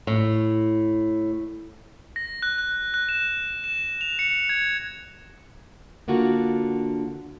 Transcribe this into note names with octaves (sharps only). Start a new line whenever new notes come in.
A2
A#6
F#6
F#6
F#6
E7
E7
F7
C#7
G#6
D3 A#3 F4 F#4